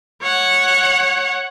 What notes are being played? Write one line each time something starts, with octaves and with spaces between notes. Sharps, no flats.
C#5 F#5